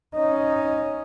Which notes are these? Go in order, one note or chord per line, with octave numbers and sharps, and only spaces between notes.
C#4 D#4